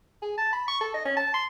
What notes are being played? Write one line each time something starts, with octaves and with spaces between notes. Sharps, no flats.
G#4
A5
B5
C#6
A4
D#5
C#4
A5
C6